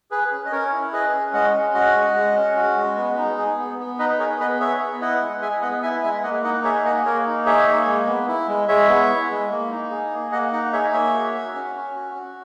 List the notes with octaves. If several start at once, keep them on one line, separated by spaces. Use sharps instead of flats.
G#4 B4
C#4
D#5
C#4 A#4 C#5
E4
G#4 B4 D#5
C#4
G#3 D#5 F#5
C#4
F#4 D#5 F#5
G#3
G#3
C#4
F#4
G#3
B3
D#4
G#4
B3
B3
D#4 B4 D#5
G#4 A#4 C#5
B3 B4 D#5
G#4 C#5 E5
B3
E4 D#5 F#5
G#3
G#4 E5 G#5
B3 D#5 F#5
E4 E5 G#5
G#3 E5 G#5
A#3 D#5 F#5
D#4 D#5 F#5
G#4 C#5 E5
A#3 D#5 F#5
A#3 A#4 C#5
D#4
G#4 C#5 E5
A#3
G#3
B3
E4
G#3
G#3 C#5 E5
B3
E4
G#3
A#3
D#4
G#4
A#3
A#3 D#5 F#5
D#4 D#5 F#5
G#4 C#5 E5
A#3 C#5 E5
F#4
F#4
C#4
C#4
F#4
F#4